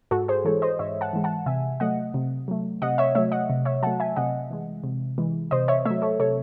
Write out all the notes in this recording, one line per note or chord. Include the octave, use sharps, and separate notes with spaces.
G#2 F#4 A4
G#4 C5
E3 G#3 A4 C#5
C5 D#5
G#2 C#5 E5
F#5 A5
E3 G#3
F#5 A5
C3 E5 G#5
F#3 A3 D#5 F#5
C3
F#3 A3
C3 D#5 F#5
C#5 E5
F#3 A3 C#5 E5
D#5 F#5
C3
C#5 E5
F#3 A3 F#5 A5
E5 G#5
C3 D#5 F#5
E3 G#3
C3
E3 G#3
C3 C5 D#5
C#5 E5
F#3 A3 C#5 E5
A4 C#5
C3 A4 C#5